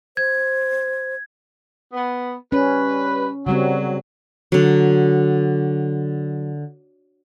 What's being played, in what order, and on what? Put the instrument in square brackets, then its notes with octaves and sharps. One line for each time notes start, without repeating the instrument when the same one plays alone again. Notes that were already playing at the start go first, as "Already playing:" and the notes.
[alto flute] C5 [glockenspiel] G#6
[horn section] B3
[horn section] G3 B4 [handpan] C#4
[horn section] F#2 F#3 [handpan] C#3 G3 C4
[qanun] D3 F#3